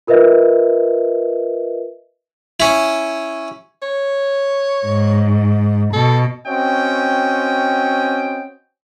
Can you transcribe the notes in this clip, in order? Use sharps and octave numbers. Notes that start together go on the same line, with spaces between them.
F4 A#4 B4 D#5 E5
C#4 E4
C#5
G#2
B2 A4
C4 C#4 F#4 D#5 G5